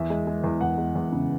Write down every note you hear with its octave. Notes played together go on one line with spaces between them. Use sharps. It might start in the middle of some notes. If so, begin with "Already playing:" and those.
Already playing: E2 E5
G#3
G#3
E2
E2 F#5
G#3
E2
C#3